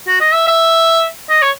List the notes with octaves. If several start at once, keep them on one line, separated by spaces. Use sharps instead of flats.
F#4
D#5
E5
E5
D#5
C#5